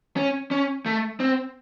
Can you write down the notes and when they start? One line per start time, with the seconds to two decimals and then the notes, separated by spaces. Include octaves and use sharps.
0.17 C#4
0.51 C#4
0.86 A3
1.20 C4